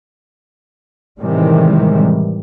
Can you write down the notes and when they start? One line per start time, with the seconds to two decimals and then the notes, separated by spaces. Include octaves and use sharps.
1.21 A2 C3 D#3 E3 G3 G#3